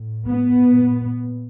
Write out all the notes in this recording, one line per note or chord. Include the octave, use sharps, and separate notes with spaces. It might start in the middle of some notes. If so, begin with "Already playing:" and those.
Already playing: A2
B3
A#2